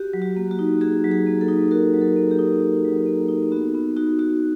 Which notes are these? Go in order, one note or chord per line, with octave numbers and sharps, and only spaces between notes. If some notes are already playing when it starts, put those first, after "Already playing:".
Already playing: F#4 G4
F#3
F#4
A#3
F#4
D#4
F#4 G#4
F#3
G#4
A#3
A4
D#4
F#4 A#4
F#3
A4
A#3
G4
D#4
F#4
F#3
A#3
D#4
B3 F#4
B3
D#4 F#4
F#4